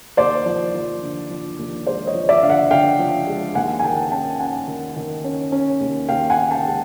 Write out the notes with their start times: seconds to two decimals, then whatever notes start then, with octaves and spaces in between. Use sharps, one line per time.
0.17 D#2 C5 D5
0.46 F3
0.74 F3
1.02 D3
1.30 F3
1.59 D#2
1.86 G#3 C5 D5
2.07 C#5 D#5
2.15 F3
2.29 D5 E5
2.43 D3 F5
2.50 E5 F#5
2.71 D3 F5 G5
2.99 F3
3.27 G#3
3.55 D#2 F#5 G#5
3.80 G#5
3.84 D#3 G5 A5
4.12 C#4 G5 A5
4.39 C#4 F#5 G#5
4.68 D#3
4.96 D#3
5.24 C#4
5.52 C#4
5.80 D#2
6.09 D#2 F5 G5
6.30 F#5 G#5
6.37 C#4
6.51 G5 A5
6.65 G#3